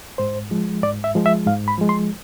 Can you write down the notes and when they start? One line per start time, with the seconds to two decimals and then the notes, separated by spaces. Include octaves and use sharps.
0.18 G#2 C5
0.51 F3 G#3
0.83 G#2 D5
1.04 E5
1.15 F3 G#3
1.26 E5
1.46 G#2 F5
1.68 B5
1.78 F3 G#3
1.89 C6